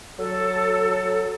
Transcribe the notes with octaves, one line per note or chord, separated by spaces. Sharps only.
F#3 A4